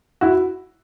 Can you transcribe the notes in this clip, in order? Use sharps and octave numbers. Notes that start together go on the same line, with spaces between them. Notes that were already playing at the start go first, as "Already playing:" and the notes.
E4 F#4